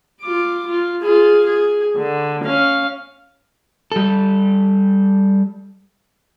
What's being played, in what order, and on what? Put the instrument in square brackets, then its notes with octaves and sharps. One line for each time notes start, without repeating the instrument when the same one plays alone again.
[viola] F4 D6
F4
F4 G#4
G#4
D3
C#4 F5
[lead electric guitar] G3 A4